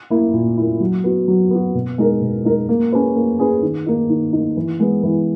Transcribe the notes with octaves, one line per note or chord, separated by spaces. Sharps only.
A#3 E4
A#2
A#3 E4
F#3
B3 F#4
F#3
B3 F#4
B2
G#3 D#4 A#4
B2
G#3 D#4 A#4
A#3
C#4 G#4 B4
A#3
C#4 G#4 B4
D#3
A#3 D#4
D#3
A#3 D#4
E3
G#3 B3
E3